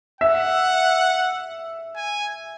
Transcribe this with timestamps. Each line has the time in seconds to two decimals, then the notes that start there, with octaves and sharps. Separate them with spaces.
0.21 E5 F#5
1.96 G#5